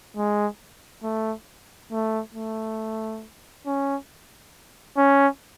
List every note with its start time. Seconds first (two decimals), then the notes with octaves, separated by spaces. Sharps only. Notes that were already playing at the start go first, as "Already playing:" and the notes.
0.17 G#3
1.03 A3
1.91 A3
2.35 A3
3.67 C#4
4.97 C#4